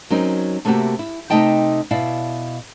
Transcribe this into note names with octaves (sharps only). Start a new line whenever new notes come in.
F#3 C4 C#4 D#4 A#4
C3 A3 A#3 D#4 F#4 G4
E4
C3 A3 D#4 D#5 G5 A5
B2 E4 D5 F5